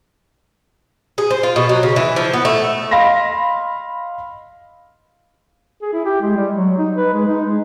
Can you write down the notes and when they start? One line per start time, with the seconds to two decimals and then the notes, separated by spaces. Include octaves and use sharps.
1.18 G#4
1.31 C5
1.43 F4
1.56 B2
1.69 F#3
1.83 C#3
1.96 E3
2.16 F3
2.33 B3
2.45 A3
2.91 D#5 F5 B5 C6 A#6
5.82 G#4
5.93 E4
6.05 G4
6.22 G#3
6.36 G3
6.55 F#3
6.78 D#4
6.97 B4
7.14 G#3
7.28 D#4
7.46 G#3